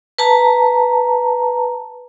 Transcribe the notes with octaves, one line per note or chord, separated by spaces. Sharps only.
B4 A5 A#5